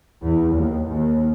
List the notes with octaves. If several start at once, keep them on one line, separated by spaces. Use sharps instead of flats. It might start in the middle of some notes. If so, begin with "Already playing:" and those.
E2
D#2
D#2